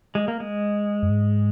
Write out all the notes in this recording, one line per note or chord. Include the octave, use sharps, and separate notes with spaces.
G#3
A#3
G#3
F#2
G#2